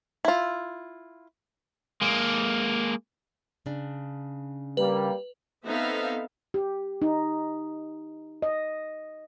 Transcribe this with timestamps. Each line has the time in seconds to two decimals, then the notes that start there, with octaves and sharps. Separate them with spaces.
0.25 E4 F4
2.01 G#3 A#3
3.66 C#3 D4
4.77 G3 A#3 B4
5.63 B3 C4 D#4 A4 E5 F5
6.54 G4
7.02 D#4
8.42 D#5